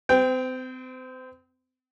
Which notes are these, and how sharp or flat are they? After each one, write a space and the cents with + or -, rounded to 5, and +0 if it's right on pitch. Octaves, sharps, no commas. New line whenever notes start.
C4 -35 G5 +0